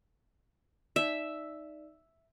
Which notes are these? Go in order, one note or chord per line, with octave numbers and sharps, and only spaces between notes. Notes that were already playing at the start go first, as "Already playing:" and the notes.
D#4 D5 E5